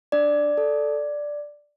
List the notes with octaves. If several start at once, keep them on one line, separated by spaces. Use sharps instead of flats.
D4 D5
A4